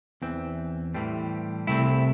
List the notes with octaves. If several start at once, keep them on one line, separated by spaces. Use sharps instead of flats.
E2 E3 C4
A2 E3 G3 C4
C2 C3 A3 C4 E4